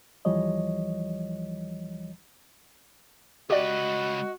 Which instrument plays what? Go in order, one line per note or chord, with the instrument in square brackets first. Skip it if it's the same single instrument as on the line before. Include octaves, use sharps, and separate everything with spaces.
[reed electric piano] D#2 E3 F3 G3 C#5 D#5
[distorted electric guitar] C#2 B4 [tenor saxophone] F#4 [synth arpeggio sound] G4 D5 [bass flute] D#5